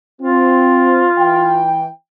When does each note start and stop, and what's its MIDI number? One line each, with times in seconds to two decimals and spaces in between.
0.22 1.05 60
0.22 1.68 65
1.18 1.86 52
1.18 1.86 79